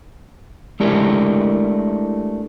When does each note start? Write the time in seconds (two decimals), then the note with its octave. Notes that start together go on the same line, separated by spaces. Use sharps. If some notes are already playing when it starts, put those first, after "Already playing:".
0.80 G#3 A3 D4 E4 G4 A#4